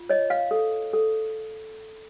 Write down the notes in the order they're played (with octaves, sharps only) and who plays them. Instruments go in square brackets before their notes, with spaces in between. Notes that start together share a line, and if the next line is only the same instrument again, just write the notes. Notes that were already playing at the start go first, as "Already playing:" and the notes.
Already playing: [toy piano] F4
C#5 D#5
F5
A4
A4